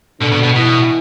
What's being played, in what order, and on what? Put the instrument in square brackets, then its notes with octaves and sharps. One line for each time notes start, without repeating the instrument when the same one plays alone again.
[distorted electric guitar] B2 [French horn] D3
[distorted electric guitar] B2
B2
[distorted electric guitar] B2 [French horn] E3